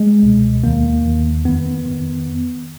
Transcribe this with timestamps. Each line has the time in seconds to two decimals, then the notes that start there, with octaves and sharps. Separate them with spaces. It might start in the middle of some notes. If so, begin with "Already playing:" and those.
Already playing: G#3
0.23 C#2 B2
0.64 D#2 D#3 A#3
1.04 D#2 D#3
1.45 F2 D#3 B3
1.85 F2 D#3